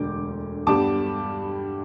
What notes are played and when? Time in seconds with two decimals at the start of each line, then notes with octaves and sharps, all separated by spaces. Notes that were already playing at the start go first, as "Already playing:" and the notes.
Already playing: E1 D2 D3 A3 D6 G6
0.67 G2 G3 B3 A5 D6